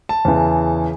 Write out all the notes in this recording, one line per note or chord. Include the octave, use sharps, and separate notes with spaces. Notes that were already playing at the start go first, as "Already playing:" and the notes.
A5
E2 C#3 E3